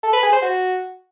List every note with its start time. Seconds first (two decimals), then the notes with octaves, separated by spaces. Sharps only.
0.03 A4
0.13 B4
0.23 G#4
0.32 C5
0.42 F#4